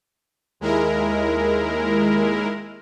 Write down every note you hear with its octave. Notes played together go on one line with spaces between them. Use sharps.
D#2 G#3 E4 A#4